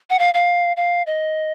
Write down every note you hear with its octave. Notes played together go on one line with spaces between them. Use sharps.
F#5
F5
F5
F5
D#5